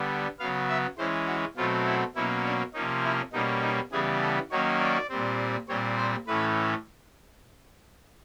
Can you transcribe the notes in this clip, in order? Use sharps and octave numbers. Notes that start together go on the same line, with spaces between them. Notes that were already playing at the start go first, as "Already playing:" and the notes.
Already playing: D3 G3 B3
C#3 F#3 B3 F5
E5
E3 G#3 C#4 C5
F#4
B2 F#3 A3 C4 F4
E4
B2 F#3 A#3 C#4 E4
D4
C3 F3 A#3 C#4 D#4
E4
B2 G3 A#3 C#4 D#4
D#4
C#3 E3 G3 B3 G#4
A4
D#3 F#3 A#3 C#4 C#5
D5
A#2 G3 C4
A#2 G3 C4 C#5
C5
A2 E3 A3 C#4 B4